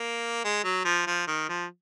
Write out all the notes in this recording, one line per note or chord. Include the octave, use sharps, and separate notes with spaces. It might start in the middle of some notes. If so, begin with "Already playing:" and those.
Already playing: A#3
G#3
F#3
F3
F3
D#3
F3